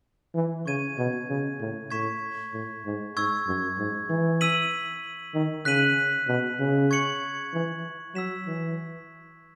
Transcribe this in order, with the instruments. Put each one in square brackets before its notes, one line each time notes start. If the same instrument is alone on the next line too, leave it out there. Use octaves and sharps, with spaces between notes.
[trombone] E3
[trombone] C#3 [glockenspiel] C#6 G#6 D#7
[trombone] B2
C#3
A2
[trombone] A2 [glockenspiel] C#6 G#6 B6 E7
[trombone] A2
G#2
[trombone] G#2 [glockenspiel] C#6 E6 G#6
[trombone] F#2
G#2
E3
[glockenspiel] E6 B6 D#7 F#7
[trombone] D#3
[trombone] C#3 [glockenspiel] F#6 B6 D#7 F#7
[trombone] B2
C#3
[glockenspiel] C#6 G#6 C#7 F#7
[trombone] E3
[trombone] F#3 [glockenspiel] E6 B6 E7
[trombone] E3